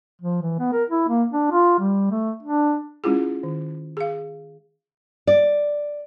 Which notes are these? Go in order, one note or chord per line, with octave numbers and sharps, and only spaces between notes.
F3
E3
B3
A#4
E4
A#3
D4
F4
G3
A3
D4
G#3 C#4 E4 F4 G#4
D#3
G#4 F5
D5